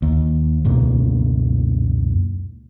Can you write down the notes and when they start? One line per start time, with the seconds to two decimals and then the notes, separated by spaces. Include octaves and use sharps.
0.02 D#2
0.65 C#2 F#2 B2 A#3